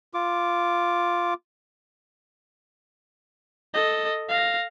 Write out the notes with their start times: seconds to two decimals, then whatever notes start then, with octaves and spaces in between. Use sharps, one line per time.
0.14 F4 D6
3.74 A4 D#5
4.29 F5 A#6